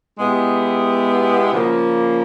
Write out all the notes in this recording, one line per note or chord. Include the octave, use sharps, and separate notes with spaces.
B2 G#3 B3 E4 G4
C#3 F3 A#3